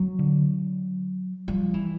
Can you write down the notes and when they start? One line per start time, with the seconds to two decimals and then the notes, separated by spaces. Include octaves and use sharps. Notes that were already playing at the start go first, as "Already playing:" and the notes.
Already playing: F#3
0.19 D3
1.48 F3 G3
1.74 E3